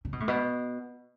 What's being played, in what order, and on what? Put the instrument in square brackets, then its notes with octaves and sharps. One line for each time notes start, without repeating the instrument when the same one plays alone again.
[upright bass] C#3
B2
A2
B2